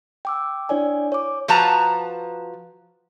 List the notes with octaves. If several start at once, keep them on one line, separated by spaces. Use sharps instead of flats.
G5 D6 E6
D4 E4 C#5 D5 G#5
C#5 D6
F3 F#4 B4 A5 A#5